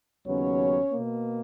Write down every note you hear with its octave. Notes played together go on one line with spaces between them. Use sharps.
D#2 C#3 F#3 B3 C#4 C#5
B2 A#3